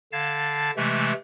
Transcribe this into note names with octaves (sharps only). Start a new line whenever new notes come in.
D3 F5 A5 G#6 A6
C3 E3 G#3 A3